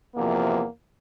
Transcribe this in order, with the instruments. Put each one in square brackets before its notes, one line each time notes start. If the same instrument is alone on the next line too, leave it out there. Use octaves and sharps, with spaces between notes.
[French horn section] E2 C3 F3 A#3